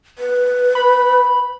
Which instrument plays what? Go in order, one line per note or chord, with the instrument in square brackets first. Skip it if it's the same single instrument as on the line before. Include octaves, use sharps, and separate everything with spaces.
[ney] B4
[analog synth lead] B5